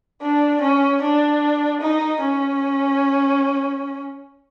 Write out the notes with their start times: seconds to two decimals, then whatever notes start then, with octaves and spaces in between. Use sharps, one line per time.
0.22 D4
0.61 C#4
1.02 D4
1.81 D#4
2.21 C#4